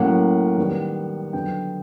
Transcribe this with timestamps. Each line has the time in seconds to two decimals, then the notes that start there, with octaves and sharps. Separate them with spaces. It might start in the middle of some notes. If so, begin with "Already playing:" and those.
Already playing: A2 F#3 A#3 C#4 F#5
0.58 D#3 G3 B3
1.33 D3 F#3 B3 G5